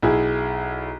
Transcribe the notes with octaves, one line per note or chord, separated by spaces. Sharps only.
B1 E4 G#4